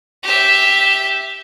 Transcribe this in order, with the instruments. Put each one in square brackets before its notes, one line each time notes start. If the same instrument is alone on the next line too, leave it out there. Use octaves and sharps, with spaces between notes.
[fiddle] G4 E5